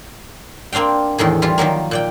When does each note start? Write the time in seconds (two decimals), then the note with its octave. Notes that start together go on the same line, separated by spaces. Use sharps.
0.72 A#3 C4 D4 F5 G5
1.18 E2 A2 D#3 G#4
1.42 E3 G3 F4
1.58 D#3 F3 F#3 A#3
1.91 A#2 D5 G5